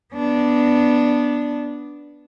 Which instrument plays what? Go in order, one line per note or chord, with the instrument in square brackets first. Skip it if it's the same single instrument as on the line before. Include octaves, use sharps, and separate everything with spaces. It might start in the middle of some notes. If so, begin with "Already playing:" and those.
[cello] B3 D4